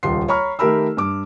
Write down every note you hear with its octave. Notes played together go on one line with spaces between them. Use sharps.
D#1 C#2 C6 C7
C#5 A#5 B5 C#6 F6
D#3 A3 G4 A#4 B5 E6
G2 D6